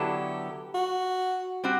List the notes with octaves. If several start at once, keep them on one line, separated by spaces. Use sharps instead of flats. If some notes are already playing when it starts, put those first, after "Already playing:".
Already playing: D3 F#3 B3 E4 G4 A4
F#4
G3 C4 F#4